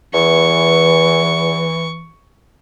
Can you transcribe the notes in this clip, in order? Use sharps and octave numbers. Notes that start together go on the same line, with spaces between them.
E2 E3 C#6